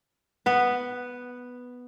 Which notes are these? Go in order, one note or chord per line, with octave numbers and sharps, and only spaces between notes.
B3 B4